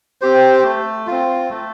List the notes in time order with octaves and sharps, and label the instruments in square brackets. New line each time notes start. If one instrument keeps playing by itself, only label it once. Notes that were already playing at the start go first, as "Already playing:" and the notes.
[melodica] C4 G4 C5
A3
C4 F4
A3